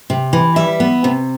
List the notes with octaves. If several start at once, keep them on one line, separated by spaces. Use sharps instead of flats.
C3
E3
G3 E5
B3
C3